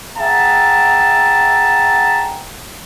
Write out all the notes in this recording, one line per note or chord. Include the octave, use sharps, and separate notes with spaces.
G#4 E5 F#5 G5 A5 A#5